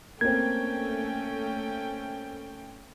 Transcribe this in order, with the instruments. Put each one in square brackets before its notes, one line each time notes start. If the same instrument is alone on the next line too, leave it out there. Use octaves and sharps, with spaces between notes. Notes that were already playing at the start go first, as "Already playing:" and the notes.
[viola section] A3 C#4 G5 [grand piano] A#3 C4 [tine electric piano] G#6